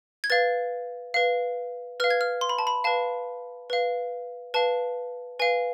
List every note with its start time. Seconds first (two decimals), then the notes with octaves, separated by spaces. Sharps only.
0.24 G#6
0.30 B4 F5 A6
1.14 B4 F5
2.00 B4 F5 F6
2.10 G#6
2.21 F6
2.41 C6
2.49 B5
2.59 A5
2.67 B5
2.84 B4 F5 A5
3.70 B4 F5
4.54 B4 F5 A5
5.39 B4 F5 G#5